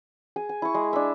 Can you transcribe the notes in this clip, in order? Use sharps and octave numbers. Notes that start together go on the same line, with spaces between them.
G#4 G#5
G#5
E4 C#6
G#3
D4 E5